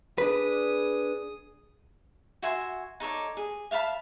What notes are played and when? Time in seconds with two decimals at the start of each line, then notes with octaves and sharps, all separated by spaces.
0.18 D4 G#4 B4 D#6
2.42 F#4 E5 G#5 C6
3.00 D#4 A4 C#5 D5
3.37 G#4
3.71 E5 F5 A5 B5